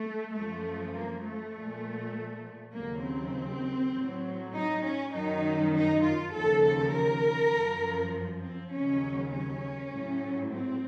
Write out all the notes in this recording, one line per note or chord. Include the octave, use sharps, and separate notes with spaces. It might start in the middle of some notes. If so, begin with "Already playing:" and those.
Already playing: A3
F#2 F3 A3
A#3
A3
A#2 F3
D#2 C#3 F#3 A#3
C4
A2 F#3
D#4
C#4
F#2 D#3 F#3 D#4
D#4
F4
D#2 C#3 F3 A4
A4
A#4
F#2 F3
C4
D#2 C#3 F#3 C#4
C#4
A2 F#3
C4